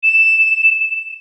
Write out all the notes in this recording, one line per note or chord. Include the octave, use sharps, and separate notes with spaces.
E7